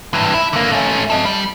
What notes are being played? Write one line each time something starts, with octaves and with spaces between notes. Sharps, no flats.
G2 E3
E4
D3 A#3
A3 C#4
A4 D#5
G3